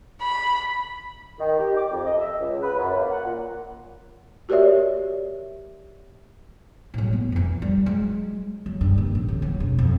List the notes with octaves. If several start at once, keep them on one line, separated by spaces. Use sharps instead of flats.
B5
D#3
G4
D6
F2
D#5
E5
C#2
B4
F#2
A#3
F#5
A#2
F#4 G4 A#4 C#5 D5 E5
A2 F#3
B3
F2 E3
G3
F#3 G#3
F#3
G2
D#2
A1
D2
F#3
E1
F2